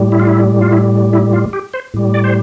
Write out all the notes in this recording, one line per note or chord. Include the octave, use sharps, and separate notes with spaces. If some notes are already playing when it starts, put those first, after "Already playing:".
Already playing: A2 G3
E4
F4
E4
F4
E4
E4
F4
G4
C5
A2 G3
D5
C5